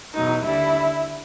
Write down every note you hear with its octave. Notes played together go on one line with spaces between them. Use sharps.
E2 B2 F#3 D#4 D#5
D#2 D3 G3 E4 E5